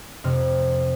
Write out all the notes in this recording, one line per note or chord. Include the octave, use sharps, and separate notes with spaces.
F2 C3 F6